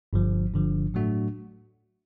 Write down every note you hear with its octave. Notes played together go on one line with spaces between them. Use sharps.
G1 G2 D3 F3
G1 G2 D3 F3
A2 F#3 A3 D4 F#4